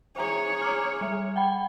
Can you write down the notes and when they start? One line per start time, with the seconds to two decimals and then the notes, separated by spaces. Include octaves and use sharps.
0.16 G#4 C5 C#5 E5 A#5
0.62 A#5 D6 F6
1.01 G3 E5
1.36 F#5 G5 B5